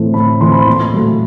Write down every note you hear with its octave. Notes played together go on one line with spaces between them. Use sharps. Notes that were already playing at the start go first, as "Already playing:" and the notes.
Already playing: A2 E3 A3 C4 E4
A2 B5
E3 A3 C4 E4 C6
B5
C6
A#2
F#3 A3